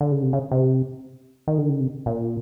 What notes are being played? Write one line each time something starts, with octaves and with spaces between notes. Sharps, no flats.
D3
C#3
C3
C#3
C3
D#3
D3
C#3
C3
A#2